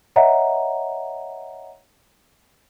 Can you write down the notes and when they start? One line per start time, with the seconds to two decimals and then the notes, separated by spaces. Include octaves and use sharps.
0.16 C#5 D#5 E5 F#5 A#5